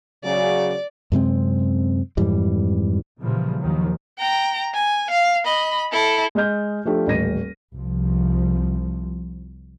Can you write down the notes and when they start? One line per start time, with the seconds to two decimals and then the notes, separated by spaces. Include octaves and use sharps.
0.24 C#3 F#3 D5
1.12 F#2 C3 G#3 C4
2.17 F2 G#2 E3 G3
3.22 A#2 C#3 E3 F3 G3
3.60 D#2 D#3 F3 F#3
4.19 G5 A#5
4.75 G#5
5.11 F5
5.45 D#5 B5
5.92 E4 A4
6.35 G#3 D#5 F6 G6
6.85 F3 A3 D4 G4 A4
7.07 D#1 A1 A#6 D#7
7.75 C2 F3